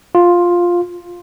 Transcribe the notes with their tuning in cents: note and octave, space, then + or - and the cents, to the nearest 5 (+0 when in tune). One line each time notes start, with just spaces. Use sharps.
F4 +5